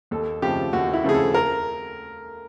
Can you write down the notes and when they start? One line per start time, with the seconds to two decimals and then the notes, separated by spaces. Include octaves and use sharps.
0.11 D#2 A4
0.42 C#3 F3 A3 C4 G4
0.73 D#2 F#4
0.93 E4
1.04 C#3 F3 A3 C4 G#4
1.15 A4
1.34 A#4